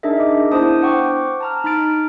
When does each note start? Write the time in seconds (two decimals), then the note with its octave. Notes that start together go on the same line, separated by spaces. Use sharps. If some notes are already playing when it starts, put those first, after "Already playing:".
0.03 D4 D#4 G#4 A#4 D#5 E5
0.20 D6
0.52 B3 D4 E4 C5 A5 D#6
0.82 C5 F#5 G5 C#6 D6
1.40 A5 A#5 F6
1.64 D#4 B5 F6 A6 D7